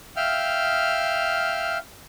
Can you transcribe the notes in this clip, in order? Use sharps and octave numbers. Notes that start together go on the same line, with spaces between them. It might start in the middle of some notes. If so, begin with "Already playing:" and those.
E5 F5 G5 F6